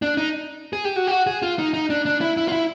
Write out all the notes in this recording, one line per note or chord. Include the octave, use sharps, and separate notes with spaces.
D4
D#4
G#4
G4
F#4
G4
F#4
G#4
F4
D#4
D#4
D4
D4
E4
E4
F4
E4